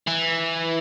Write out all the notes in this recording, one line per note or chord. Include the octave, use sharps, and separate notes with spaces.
E3